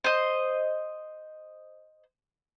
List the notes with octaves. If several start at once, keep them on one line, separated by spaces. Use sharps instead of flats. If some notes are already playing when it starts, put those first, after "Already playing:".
C5 D#5